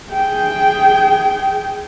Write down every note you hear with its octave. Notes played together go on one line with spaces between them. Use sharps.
G#4 G5